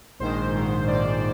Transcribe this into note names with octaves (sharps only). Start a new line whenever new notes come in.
A#1 G#2 D#3 C5
A#1 G#2 D#3
A#1 G#2 D#3 D5